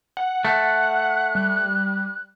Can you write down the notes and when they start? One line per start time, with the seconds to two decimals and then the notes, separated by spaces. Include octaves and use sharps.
0.17 F#5
0.45 A3 F#6
1.35 G3